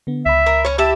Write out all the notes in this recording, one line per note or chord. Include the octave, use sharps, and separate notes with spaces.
D3 B3
C#2 E5 B5
A#4
C#4 C#5
E4 G4 E5 A5